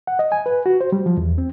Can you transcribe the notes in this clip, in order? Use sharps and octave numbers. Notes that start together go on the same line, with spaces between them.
F#5
D#5
G#5
B4
F#4
C5
G3
F3
E2
C4